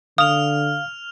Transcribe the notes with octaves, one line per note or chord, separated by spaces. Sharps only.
D3 F5 D#6 F6 F7